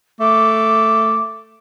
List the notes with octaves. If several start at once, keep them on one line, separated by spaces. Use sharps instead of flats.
A3 D6